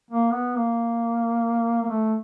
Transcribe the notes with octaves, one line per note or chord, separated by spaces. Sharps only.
A#3
B3
A#3
A#3
A3